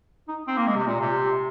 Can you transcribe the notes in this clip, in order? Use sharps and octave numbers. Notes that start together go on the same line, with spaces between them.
D#4
C4
A#3
G#3
C3
A#2
C3